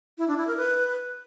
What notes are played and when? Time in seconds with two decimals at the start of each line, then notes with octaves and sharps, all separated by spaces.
0.18 E4
0.28 D4
0.37 E4
0.47 A#4
0.57 B4